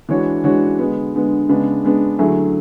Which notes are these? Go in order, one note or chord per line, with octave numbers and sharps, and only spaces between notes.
E3 G#3 D4 F#4 C#5
E3 G#3 D4 F#4 C#5
D3 G#3 B3
D3 G#3 B3
C#3 G#3 B3 D4
C#3 G#3 B3 D4
D3 F#3 A3 E4 G#4